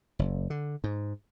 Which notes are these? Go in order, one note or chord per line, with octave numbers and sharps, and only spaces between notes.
F#1
D3
G#2